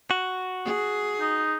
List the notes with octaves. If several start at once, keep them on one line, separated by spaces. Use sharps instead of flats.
F#4
G#4
D#4